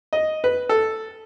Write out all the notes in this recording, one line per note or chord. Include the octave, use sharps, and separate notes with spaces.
D#5
B4
A4